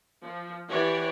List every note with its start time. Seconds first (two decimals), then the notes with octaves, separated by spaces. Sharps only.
0.23 F3
0.68 E3 G4 C#5 D5 F#5